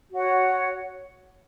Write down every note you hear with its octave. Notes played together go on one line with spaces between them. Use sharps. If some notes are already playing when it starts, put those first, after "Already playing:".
F#4 C#5 F#5